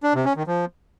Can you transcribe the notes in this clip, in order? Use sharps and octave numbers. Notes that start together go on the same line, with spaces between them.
D4
C3
C#4
D#3
F3